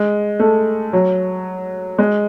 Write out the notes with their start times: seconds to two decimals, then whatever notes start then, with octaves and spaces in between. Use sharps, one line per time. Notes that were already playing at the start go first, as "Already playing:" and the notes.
Already playing: G#3
0.40 A3
0.93 F#3
1.99 G#3